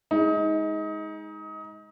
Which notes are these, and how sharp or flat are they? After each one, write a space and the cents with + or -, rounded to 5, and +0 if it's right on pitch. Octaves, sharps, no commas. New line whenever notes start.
G#3 +0 D#4 +25